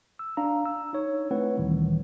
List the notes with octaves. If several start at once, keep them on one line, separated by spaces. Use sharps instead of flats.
E6
D4 F5 A#5
E6
D#4 C#5
A3 C4 E4 B4 C#5 F#5
D2 A#2 D#3 E3 G3